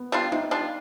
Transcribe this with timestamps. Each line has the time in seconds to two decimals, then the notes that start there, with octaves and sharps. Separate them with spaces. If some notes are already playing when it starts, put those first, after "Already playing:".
Already playing: B3
0.12 G3 D4 F4
0.32 C3 D#4
0.51 G3 D4 F4